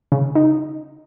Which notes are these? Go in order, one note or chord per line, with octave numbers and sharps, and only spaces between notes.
C#3
D#4